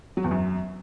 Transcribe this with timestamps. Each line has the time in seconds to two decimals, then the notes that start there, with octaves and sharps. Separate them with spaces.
0.17 F#3
0.24 E2
0.31 F#2